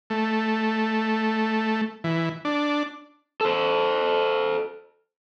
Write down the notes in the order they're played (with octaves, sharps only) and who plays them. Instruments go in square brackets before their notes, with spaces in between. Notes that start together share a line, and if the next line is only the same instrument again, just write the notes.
[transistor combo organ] A3
E3
D4
[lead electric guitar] A4 C5